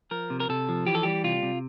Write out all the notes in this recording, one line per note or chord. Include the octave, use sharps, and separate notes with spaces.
F3 A#4
C3
A#4
C3 A4
F3
E3 G4
A4
G3 G4
C3 F4
C3